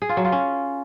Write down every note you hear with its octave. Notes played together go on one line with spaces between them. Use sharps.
G#4
F4
F#3
F4
C#4